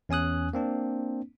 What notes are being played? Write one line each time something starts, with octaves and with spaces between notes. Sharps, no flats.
E2 C#4 G#5 D#6 F#6
A#3 C4 D4